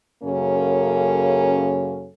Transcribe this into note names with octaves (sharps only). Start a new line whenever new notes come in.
F#2 C#3 A#3 C#4 A4